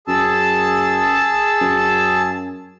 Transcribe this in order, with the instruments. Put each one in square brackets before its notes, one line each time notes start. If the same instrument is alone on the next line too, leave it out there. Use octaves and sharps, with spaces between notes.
[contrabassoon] F#2 [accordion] G#4 A5 E6
[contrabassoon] F#2